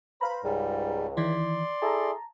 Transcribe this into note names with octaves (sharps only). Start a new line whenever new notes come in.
B4 C5 F5 A#5 B5
C#2 G#2 G3
D#3 E3 E4 D5 C6
E4 G#4 A4 A5 A#5